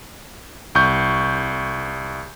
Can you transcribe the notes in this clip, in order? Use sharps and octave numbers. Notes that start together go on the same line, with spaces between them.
C2 C#6 G6